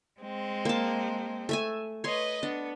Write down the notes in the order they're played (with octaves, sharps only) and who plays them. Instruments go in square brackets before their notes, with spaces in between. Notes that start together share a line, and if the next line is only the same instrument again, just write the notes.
[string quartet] G#3 C4
[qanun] A#3 A5
A3 E5 G#5
[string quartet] B4 D#5 [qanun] C#5 C6
[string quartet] B3 [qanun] D4